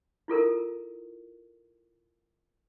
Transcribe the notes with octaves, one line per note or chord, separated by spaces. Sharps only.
E4 F4 A4 A#4